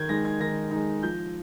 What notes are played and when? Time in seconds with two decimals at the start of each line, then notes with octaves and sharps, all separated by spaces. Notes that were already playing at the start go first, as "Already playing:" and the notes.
Already playing: D#3 G6 G#6
0.09 G#3 D#4 A#6
0.25 G#6
0.40 D#3 A#6
0.71 G#3 D#4
1.03 F3 G6